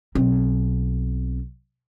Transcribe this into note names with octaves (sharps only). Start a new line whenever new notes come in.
B1 C4